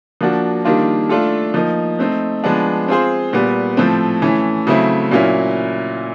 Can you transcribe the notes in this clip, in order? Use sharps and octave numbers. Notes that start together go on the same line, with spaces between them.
F3 A#3 D4 F#4
D#3 G3 A#3 D4 F4
A3 D4 F4 A4
F3 A#3 D#4
A3 C4 D#4
F3 G#3 B3 D4
C4 F4 G#4 C5
A#2 G3 B3
A2 F3 A3 C4
E3 A3 C#4
C#3 F#3 A3 C4 E4
A#2 F#3 A#3 C#4 E4